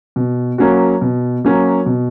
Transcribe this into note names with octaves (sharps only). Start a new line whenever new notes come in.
B2
F#3 A#3 C#4 F#4
B2
F#3 A#3 C#4 F#4
B2